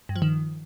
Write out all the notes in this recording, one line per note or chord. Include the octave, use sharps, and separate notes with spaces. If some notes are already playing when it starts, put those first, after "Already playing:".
G2
F3
D#3